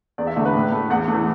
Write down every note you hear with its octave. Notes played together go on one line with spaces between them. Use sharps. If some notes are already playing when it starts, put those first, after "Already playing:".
E2 D5
E5
D3 A3
B4
A2
A3
E2 F#5
A3
E3